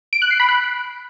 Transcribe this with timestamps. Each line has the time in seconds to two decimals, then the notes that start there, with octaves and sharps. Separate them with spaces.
0.13 D7
0.22 F#6
0.31 C7
0.40 B5
0.49 F#6